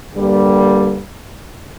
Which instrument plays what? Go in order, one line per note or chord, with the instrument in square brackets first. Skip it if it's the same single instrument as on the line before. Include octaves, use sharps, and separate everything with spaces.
[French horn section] G2 D3 G3 A#3